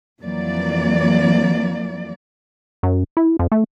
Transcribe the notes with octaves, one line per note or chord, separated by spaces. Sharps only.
F2 E3 F#3 A#3 D5
F#2
E4
F2
A3